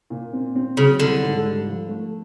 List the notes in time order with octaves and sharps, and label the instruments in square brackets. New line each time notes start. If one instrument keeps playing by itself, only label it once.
[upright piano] A#2
C4
C4
[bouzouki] C#3 [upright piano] F#3
[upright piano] C2 [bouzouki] D3
[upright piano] G#2
G3
F3
A3